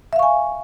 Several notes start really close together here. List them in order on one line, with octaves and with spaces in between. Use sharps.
E5 F5 C#6 G#5